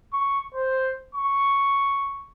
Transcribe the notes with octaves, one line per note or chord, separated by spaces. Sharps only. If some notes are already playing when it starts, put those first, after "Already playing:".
C#6
C5
C#6